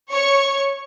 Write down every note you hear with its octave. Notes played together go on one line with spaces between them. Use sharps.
C#5 C#6